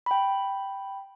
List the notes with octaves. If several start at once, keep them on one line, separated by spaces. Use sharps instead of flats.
G5 B5